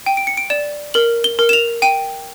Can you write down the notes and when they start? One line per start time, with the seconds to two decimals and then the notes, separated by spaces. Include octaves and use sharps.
0.06 G5 D#7
0.17 D7
0.27 C#7
0.37 D7
0.50 D5 E7
0.94 A#4 F#7
1.24 G7
1.39 A#4
1.49 E7
1.53 F7
1.82 G5 D#7